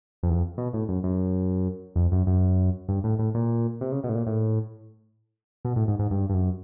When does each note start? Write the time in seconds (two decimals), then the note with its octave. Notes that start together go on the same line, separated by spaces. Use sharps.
0.23 F2
0.30 E2
0.35 F2
0.58 B2
0.73 A2
0.88 F#2
1.03 F#2
1.96 F2
2.12 F#2
2.27 F#2
2.88 G2
3.04 A2
3.19 A2
3.34 A#2
3.81 C3
3.92 C#3
4.04 B2
4.09 A2
4.15 A#2
4.26 A2
5.65 B2
5.76 A2
5.88 G#2
5.99 G#2
6.11 G2
6.29 G2
6.34 F#2